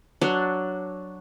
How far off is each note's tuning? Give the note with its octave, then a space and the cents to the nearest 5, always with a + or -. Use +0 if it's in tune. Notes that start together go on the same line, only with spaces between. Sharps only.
F#3 +0 D4 +0